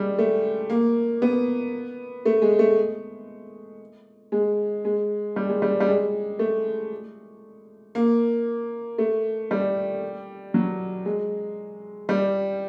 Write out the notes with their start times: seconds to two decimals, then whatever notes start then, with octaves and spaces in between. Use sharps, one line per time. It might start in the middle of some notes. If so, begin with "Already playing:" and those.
Already playing: G3 G#3
0.19 A3
0.70 A#3
1.22 B3
2.25 A3
2.42 G#3
2.59 A3
4.32 G#3
4.85 G#3
5.36 G3
5.49 G#3
5.62 G3
5.80 G3
5.88 G#3
6.39 A3
7.95 A#3
8.98 A3
9.51 G3
10.54 F#3
11.05 G#3
12.09 G3